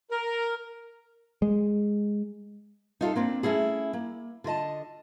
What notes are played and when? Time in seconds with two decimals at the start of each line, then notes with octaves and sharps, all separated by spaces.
0.11 A#4
1.42 G#3
3.01 D#4 F4 G#4 A4
3.16 A#3 C4 D4
3.43 A3 C#4 E4 G#4
3.93 A#3
4.44 D3 F4 D#5 A5